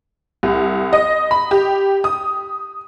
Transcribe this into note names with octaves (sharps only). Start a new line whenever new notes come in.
C2
D#5
B5
G4
D#6